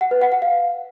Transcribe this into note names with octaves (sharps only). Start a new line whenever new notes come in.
F#5
B4
F#5
F#5
F5